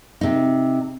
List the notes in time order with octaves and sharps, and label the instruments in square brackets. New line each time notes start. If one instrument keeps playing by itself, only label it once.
[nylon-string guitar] C3 D#4